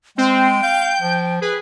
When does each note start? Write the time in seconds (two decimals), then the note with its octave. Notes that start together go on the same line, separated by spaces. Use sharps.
0.18 G#3 C4 G5
0.63 F5 G6
1.01 F3
1.42 G#4 B4